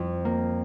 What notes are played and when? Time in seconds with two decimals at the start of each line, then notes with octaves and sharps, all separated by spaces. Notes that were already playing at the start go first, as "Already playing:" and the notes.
Already playing: F2
0.25 A#3